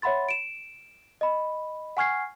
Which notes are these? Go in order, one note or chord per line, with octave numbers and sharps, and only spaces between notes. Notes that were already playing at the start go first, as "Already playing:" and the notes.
C#5 E5 F#5 B5 C6 A6
D7 E7
D#5 B5
F#5 G#5 C#6 F6 G#6 C7